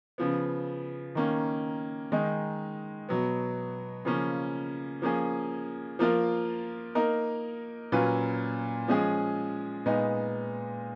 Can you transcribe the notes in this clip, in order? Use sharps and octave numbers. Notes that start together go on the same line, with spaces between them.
C#3 F3 B3
D#3 A#3 C#4
D#3 G#3 D#4
B2 F#3 B3
C#3 F3 A#3 C#4
F3 A#3 C#4 G#4
F3 A#3 F4 A#4
A#3 D#4 A#4
A#2 F#3 C#4 F4 B4
F3 G#3 C#4 G#4
A#2 G#3 B3 D#4